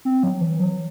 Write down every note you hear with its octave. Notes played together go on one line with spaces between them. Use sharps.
C4
F#3
E3
F#3